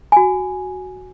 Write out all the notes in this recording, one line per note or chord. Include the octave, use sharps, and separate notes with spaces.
F#4 G#5